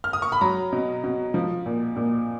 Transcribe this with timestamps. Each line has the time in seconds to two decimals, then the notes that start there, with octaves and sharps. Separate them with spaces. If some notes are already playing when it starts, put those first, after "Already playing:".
0.04 F6
0.13 D#6
0.22 C#6
0.32 B5
0.41 F#3 A#5
0.73 B2
1.04 B2
1.34 F3
1.66 A#2
1.96 A#2